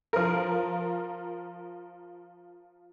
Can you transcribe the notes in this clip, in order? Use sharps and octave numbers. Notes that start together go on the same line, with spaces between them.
F3 A#4